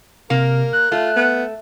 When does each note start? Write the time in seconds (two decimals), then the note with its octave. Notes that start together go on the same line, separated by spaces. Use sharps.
0.30 C3 A#3 A#4
0.73 F#6
0.92 A3 F4
1.16 B3